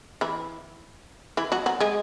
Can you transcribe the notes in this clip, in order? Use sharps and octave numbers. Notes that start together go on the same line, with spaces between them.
E3 E4
E3 E4
F#3 F#4
F#3 F#4
G#3 G#4